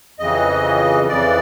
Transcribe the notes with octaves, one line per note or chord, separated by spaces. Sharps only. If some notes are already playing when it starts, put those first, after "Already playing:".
F2 C#3 E3 D#5
F2 C#3 E3 D5